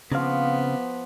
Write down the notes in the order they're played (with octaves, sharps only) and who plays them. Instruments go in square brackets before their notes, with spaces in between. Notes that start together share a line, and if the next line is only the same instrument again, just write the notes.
[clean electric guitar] C#3 C4 F5 [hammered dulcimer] F3 C#6 D6 [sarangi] B3